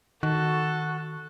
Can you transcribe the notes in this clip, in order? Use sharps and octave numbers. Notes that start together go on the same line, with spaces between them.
D#3 F#4 A4